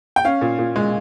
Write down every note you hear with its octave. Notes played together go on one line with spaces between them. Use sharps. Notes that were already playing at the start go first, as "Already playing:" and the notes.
G5
C#4 F5
A#2
A#2
G#3